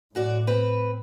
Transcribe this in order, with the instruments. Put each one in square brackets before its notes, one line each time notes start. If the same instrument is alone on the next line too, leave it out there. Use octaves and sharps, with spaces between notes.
[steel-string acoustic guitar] F#2 F#4 D5 [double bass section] A2
[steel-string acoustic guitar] C4 B4